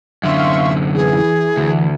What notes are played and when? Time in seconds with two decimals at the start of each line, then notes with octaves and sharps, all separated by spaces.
0.24 F#2 D3 E5 F5 C6 C#6
0.95 E3 G#4
1.57 D2